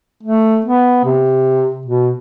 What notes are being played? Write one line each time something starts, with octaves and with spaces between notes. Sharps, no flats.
A3
B3
C3
B2